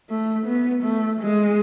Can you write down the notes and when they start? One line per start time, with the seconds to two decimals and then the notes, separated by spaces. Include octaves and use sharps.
0.10 A3
0.47 B3
0.84 A3
1.20 G#3